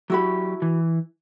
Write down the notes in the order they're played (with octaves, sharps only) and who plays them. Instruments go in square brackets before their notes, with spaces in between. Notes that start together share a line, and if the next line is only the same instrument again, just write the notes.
[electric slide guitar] F#3 G4 [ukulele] E4 F#4 B5
[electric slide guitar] E3